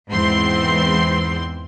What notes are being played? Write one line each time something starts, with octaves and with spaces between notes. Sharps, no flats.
E2 G#2 E3 C4 C6